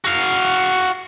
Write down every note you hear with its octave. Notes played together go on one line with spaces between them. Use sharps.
F#4 F5